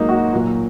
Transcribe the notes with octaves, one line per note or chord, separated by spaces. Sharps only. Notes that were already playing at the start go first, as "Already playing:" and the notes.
Already playing: G#2 F#3 A#3 D#4
F#4
A#2 F#3 A#3